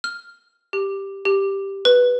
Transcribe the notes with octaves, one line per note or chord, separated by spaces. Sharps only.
F6
G4
G4
B4